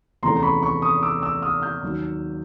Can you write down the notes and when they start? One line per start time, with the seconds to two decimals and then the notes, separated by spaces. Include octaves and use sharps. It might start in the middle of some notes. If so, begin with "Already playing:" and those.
0.23 E2 C3 E3 A3 C#4 A#5 C6
0.43 B5 C#6
0.62 B5 C#6
0.82 C#6 D#6
1.03 D6 E6
1.22 D6 E6
1.42 D#6 F6
1.62 F6 G6
1.83 D#2 D#3 F#3